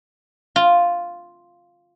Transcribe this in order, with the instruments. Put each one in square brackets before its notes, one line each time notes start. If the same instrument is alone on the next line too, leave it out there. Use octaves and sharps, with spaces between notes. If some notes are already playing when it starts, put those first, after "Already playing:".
[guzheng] F4